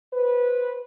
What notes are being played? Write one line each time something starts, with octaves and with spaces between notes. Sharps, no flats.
B4 C5